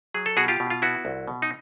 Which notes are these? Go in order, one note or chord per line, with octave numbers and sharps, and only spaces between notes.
F#3 G#4
A4
B2 F#4 G#4
F4 G4
B2
F4
B3 E4 F#4
C2
B2
D#4